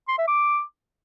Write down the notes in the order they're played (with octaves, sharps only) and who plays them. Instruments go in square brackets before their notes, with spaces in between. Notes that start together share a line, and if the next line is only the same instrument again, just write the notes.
[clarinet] C6
E5
D6